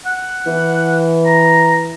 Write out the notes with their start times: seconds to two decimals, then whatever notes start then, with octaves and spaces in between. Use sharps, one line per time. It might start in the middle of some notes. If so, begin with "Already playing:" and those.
0.06 F#5
0.46 E3
1.26 A#5